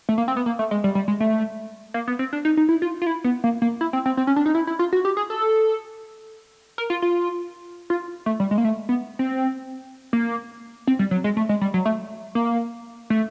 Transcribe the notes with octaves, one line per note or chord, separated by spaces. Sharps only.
A3
A#3
C4
B3
A#3
A3
G#3
G3
G3
G#3
A3
A#3
B3
C4
D4
D#4
D#4
E4
F4
F4
E4
B3
A#3
A#3
E4
C4
C4
C4
C#4
D4
D#4
E4
E4
F4
F#4
G4
G#4
A4
A#4
F4
F4
F4
A3
G3
G#3
A#3
A3
B3
C4
A#3
C4
G3
F#3
G#3
A3
G#3
G3
F#3
A3
A#3
A3